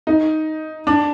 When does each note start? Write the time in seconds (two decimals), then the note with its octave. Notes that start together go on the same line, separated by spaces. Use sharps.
0.07 D#4
0.87 D4